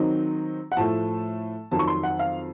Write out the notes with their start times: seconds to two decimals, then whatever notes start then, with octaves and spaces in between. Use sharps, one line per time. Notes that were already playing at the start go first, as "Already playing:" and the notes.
Already playing: D#3 F#3 C4 D#4
0.72 F#5
0.77 A2 F3 A3 A5
1.71 F2 D#3 F#3 A5
1.79 C#6
1.87 C6
2.03 F#5
2.19 F5